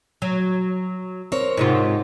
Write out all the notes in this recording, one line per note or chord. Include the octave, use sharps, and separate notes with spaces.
F#3
C4 A#4 C#5
G#2 C3 F4